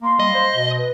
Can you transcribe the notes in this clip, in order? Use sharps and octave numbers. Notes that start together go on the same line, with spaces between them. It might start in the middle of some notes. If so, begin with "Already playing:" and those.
A#3 F5 C6
G3 D#5
C5
B2
B4